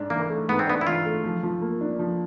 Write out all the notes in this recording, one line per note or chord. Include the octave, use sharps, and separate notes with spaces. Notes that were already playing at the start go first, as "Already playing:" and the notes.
Already playing: G#2 D4
E3 A#3
A3
G#2 B3
C4
B3 D4
E4
E3 F4
A3
F3
F3
A#3
D4
F3